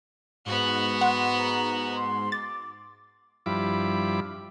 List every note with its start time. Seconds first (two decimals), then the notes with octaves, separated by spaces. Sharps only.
0.46 G#2 B3 F#4
1.01 F#5 C6
1.38 A#5
1.95 C6
2.32 D6 A6
3.46 G2 F3 E4 B5 D6